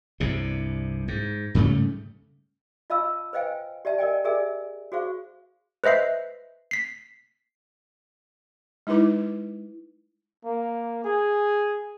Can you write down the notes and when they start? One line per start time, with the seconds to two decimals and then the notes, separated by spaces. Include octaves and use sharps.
0.20 C2 G2 C3
1.08 G#2
1.55 G#2 C#3 G3 A3
2.90 F4 D#5 F5 A5 B5 E6
3.33 B4 C5 D#5 F5 G5 G#5
3.85 G4 D5 E5 A5
3.98 A#4 D5 D#5 G5 G#5
4.24 G4 G#4 A#4 D5 E5 G#5
4.92 F#4 G#4 C5 F5 C#6
5.84 B4 C5 D#5 E5 C7
6.71 B6 C7
8.87 G#3 D#4 E4 B4 D6
10.45 A#3
11.05 G#4